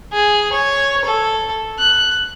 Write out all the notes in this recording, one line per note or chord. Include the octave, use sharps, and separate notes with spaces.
G#4
C#5
A4
F#6